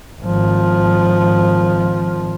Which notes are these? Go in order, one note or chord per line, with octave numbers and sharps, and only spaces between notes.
G#1 F3